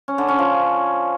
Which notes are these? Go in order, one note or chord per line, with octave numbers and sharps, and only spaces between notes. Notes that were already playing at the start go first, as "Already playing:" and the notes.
C#4
D3
C#4
F3